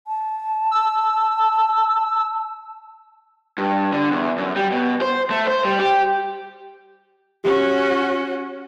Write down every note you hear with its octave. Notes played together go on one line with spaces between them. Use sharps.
A5
E6
G2
D3
E2
F#2
G3
B2
C5
A3
C5
G3
G4
C#4 F#4 G4